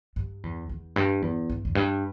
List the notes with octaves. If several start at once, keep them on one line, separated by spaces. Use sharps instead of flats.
G2
E2
E2
G2
E2
G2
E2
G2